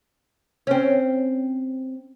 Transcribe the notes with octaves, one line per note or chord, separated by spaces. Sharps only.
C4 C#4